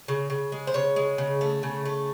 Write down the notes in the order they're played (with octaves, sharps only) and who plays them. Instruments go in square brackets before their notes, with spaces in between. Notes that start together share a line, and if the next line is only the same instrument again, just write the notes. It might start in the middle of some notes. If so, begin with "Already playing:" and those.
[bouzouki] C#3
C#3
G#3
C5
C#3 C#5
G#3
C#3
A3
C#3
A3